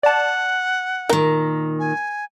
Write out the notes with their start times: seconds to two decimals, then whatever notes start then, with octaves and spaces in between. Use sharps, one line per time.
0.03 D5 F#5 A5
1.09 A#2 D#3 A#4
1.79 G#5